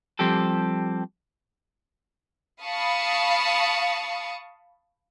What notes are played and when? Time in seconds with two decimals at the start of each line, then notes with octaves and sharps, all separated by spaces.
0.19 F3 G3 C4 G4 A4
2.63 F5 A5 B5 C#6 D#6